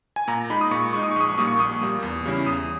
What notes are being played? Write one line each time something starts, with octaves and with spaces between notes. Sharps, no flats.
G#5
A#2 A#5
G#3 D#4 B5
D#6
A#2 C#6
G#3 D#4 C#6
D#6
C#6
A#1 D#6
C#6
A#2 G3 A#3 D#6
C#6
A#1 D#6
A#2 G3 A#3
E2
C#3 G3 C#4 E4
E2 D#6